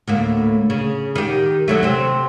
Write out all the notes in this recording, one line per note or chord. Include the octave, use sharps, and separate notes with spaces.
D2 A2 A#3
C#3
D#3 G4
D3 F#3 A3
C3 C4